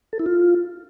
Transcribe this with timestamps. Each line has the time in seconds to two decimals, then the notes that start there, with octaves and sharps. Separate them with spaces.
0.13 A4
0.19 E4
0.26 F4